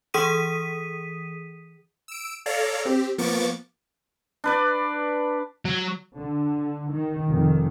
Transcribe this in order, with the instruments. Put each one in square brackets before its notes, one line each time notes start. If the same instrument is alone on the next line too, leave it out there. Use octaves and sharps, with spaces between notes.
[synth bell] E3 G#4 D#6 B6 D#7
[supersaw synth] E6 D7
A4 C#5 D5 F5 A#5
C4 G4
F3 A#3 B3 C#6 D6 A6
[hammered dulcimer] D4 B4 D5
[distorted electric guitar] F#3
[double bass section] D3
D#3
F1 D#3